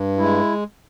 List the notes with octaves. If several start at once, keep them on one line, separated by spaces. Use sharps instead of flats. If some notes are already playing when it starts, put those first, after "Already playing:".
Already playing: G2
G#3 E4